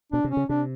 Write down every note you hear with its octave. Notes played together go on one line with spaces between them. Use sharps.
B2 D4
C3
C#4
C#3
C3 D4